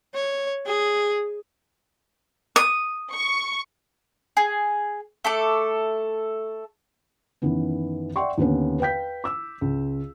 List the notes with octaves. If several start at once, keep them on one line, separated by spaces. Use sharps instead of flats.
C#5
G#4
D#6
C#6
G#4
A3 A4 D6
F#2 D#3 E3 B3
D5 E5 F#5 G5 C6 C#6
D#2 D3 B3 C#4
B4 F5 G5 G6 B6
D6 E6
C#2